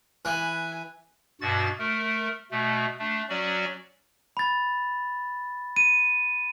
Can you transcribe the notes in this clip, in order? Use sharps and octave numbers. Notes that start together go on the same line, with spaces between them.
E3 B4 G#5 F#6
G2 B2 F#4 A6
A3 A#4
B2 A3
A3 D4
F#3 C#4 F#4 D5
B5 A6
D#7